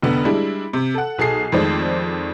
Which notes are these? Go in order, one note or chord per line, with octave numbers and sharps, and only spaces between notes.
F1 D3 B3
G3 G#3 D4 E4
C3
A4 F#5
B1 G#4 A4 C7
F2 D#3 G#3 A3 C5 D5